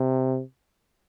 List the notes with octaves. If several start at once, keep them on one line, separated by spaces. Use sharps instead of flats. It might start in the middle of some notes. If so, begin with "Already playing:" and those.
Already playing: C3